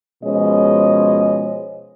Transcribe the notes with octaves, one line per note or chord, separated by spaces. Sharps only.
B2 F3 G#3 C#4 C#5 D#5